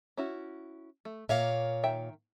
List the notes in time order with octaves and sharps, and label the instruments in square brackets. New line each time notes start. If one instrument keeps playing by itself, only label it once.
[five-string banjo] C#4 E4 F#4
A3
[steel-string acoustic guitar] A#2 C#5 F5 [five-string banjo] A#3 E5
[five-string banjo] D#3 E5 G5